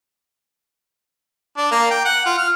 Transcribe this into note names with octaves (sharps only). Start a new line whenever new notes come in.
D4
A#3
G5
F#5
F4
F6